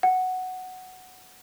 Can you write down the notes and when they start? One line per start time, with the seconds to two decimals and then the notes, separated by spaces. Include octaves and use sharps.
0.03 F#5